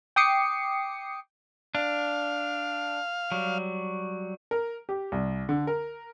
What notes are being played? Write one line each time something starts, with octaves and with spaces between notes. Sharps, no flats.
G5 D6 D#6 C7 C#7
D4 F5
F#3 G3
A#4
G4
C2
D3
A#4